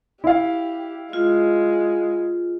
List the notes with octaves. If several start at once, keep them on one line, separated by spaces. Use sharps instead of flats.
E4 G4 F5
G#3 F4